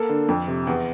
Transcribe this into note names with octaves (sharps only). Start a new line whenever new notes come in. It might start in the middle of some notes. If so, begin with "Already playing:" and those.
Already playing: A#3 A4
D3
F2
C3
E2